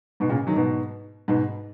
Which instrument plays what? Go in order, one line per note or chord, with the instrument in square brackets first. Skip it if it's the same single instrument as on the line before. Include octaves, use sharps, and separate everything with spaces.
[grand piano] G#2 B2
A#2 C#3
D#3 F#3
G#2 B2
G#2 B2